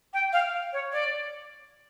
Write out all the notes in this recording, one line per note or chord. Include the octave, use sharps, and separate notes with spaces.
G5
F5
C#5
D5